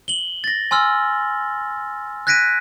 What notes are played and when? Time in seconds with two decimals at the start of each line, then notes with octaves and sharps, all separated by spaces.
0.08 F#7 G7
0.44 A6 A#6
0.71 G#5 C6 E6 F6
2.27 F#6 G#6 A#6 B6 D7 D#7